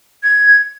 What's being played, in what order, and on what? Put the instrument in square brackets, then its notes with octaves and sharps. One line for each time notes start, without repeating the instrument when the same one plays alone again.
[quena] G#6